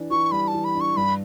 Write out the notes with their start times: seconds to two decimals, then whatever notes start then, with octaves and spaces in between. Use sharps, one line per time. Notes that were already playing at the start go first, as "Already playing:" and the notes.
Already playing: E3 D4
0.10 E3 C#6
0.32 G3 B5
0.48 A5
0.54 E3
0.64 B5
0.75 D4
0.81 C#6
0.97 G2 B5